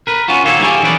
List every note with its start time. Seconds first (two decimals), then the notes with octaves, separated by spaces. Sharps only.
0.07 A#4 B4
0.28 B3 C#4 F4 F#4
0.45 D#2 A#2 A#3 C4 A4 C#5
0.61 G3 E4 G#4 A4 D5
0.83 E3 C#4 B4 D5